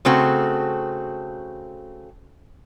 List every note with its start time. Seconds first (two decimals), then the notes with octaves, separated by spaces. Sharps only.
0.05 C#3 A3 C4 F#4